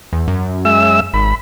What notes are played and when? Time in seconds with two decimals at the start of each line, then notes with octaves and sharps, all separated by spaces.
0.13 E2
0.28 F#2
0.65 G#3 E5 E6
1.14 G#1 B5